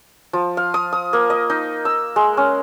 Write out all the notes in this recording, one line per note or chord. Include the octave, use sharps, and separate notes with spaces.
F3
F5
D#6
D#6
A#3
D#5
D#4
E6
G#3
C#4